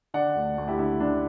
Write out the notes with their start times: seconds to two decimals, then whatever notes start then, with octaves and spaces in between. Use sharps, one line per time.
0.14 D3 D5 F#5
0.36 D2
0.58 D2
0.68 E4 G4
0.79 D3 E4
1.00 D3 D4